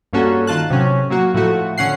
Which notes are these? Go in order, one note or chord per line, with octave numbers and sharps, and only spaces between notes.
G2 A#3 C#4 F#4 A4
D#3 F4 A5 F#6
A2 C3 F#3 C#4
F#3 A#3 F#4
A2 F3 A3 F#4
D3 C#4 F#5 C7